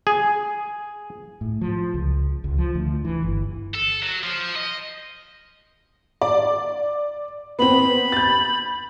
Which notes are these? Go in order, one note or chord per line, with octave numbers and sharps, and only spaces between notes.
G#4
A2
F3
C#2
C#2
F3
D2
E3
G1
A4
F#3
F3
D#5
D5
B3 C4 B5
G6 A6